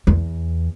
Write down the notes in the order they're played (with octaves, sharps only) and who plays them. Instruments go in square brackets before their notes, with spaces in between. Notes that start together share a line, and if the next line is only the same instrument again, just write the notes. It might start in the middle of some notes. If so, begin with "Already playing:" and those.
[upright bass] E2